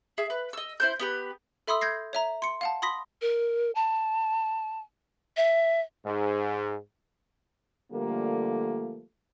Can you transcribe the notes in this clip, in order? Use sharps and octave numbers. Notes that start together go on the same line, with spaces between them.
G#4 E5
B4
D#5 E6
E4 C5 G6
B3 G4 B4
A4 E5 B5 C6 D#6 E6
G6 G#6 A#6 C7
C#5 E5 A#5
C6 C#7
F5 F#5 A5
B5 C6 D#6 A#6 B6
A#4
A5
E5
G#2
D3 F3 G3 A3 A#3